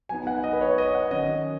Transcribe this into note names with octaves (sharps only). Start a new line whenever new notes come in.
F#3 B3 D#4 G#5
F#5
D#5
B4
C#5
D#5
F#5
D#3 F#3 C#4 D#5